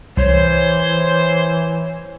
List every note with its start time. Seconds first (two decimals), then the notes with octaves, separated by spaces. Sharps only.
0.17 C2 E3 C5 C#5